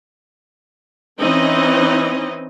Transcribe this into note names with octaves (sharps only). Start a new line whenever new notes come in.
E3 C4 C#4 D#4 D#5